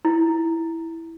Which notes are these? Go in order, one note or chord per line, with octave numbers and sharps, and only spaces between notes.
E4